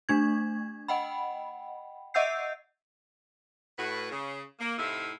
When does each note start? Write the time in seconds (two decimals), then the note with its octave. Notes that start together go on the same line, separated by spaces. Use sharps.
0.09 A3 D4 G#6
0.88 D#5 F#5 G5 B5
2.14 D#5 E5 F#5 E6 G6 C7
3.77 A2 F#4 B4
4.11 C#3
4.59 A#3
4.78 A2 C3 D#4 E4 E5 F5